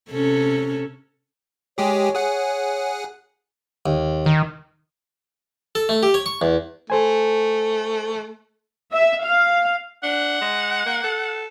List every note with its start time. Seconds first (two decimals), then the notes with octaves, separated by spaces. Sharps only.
0.11 C3 C#4 A4
1.78 G#3 G4 G#4 C#5
2.15 G#4 F#5
3.86 D#2
4.26 D#3
5.75 A4
5.89 A3
6.03 G4
6.14 C#5
6.26 C#6
6.42 E2
6.90 A3 A4 C5 G#5
8.92 E5
9.23 F5
10.03 D4 F#5
10.41 G#3
10.86 A#3
11.04 A4